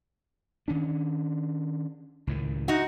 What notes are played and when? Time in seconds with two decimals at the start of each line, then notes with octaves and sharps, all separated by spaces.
0.68 D#3 C#4 D4
2.27 C#2 A2 D#3
2.68 D#4 F#4